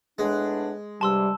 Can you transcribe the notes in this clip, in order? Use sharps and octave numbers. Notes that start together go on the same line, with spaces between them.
A2 G#3 B3 D4
G2 C3 G3 A5 C6 E6